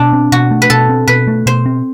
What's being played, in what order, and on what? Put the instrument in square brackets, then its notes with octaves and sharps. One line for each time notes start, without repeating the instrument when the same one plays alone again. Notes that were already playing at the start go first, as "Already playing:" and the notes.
Already playing: [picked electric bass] B2 [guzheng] D4
[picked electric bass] C4
[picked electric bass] B2 [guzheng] F#4
[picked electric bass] A3
[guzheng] B4
[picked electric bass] B2 [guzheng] A4
[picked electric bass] C4
[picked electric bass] B2 [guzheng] B4
[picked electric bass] A3
[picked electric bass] B2 [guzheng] C5
[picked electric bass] C4